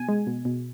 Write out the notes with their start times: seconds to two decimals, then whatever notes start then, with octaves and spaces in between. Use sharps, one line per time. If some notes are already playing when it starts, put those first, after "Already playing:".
Already playing: B2 G#5
0.09 G#3
0.27 B2
0.45 B2